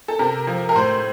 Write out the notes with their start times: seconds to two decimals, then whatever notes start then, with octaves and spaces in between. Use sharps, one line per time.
0.08 A4
0.19 C3 A#4
0.47 F3
0.69 A#4
0.76 A2 C5